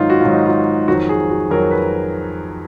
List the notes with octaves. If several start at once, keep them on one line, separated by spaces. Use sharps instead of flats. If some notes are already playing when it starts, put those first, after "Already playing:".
Already playing: G#2 D#3 F#3 D#4 F4
F#4
G#2 D#3 F#3 F4
D#4
F4
F2 D#3 F#3 F#4
G#4
F#4
F2 D#3 F#3 A#4
B4